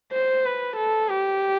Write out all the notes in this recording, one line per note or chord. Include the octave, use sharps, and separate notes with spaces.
C5
B4
A4
G4